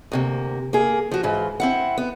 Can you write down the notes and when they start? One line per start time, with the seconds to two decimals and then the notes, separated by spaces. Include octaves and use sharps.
0.12 D2 C3 A#3
0.73 A#3 G#4
1.11 F3 F#4
1.23 G#2 E3 F4
1.60 C4 E4 F#5
1.98 B3